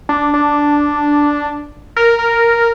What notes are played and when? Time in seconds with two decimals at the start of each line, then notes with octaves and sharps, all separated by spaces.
0.09 D4
0.34 D4
1.96 A#4
2.19 A#4